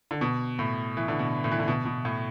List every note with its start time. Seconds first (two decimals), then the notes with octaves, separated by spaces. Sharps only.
0.11 D3
0.21 B2
0.59 A2
0.97 E3
1.08 D3
1.19 B2
1.44 A2
1.51 E3
1.59 D3
1.68 B2
1.85 B2
2.05 A2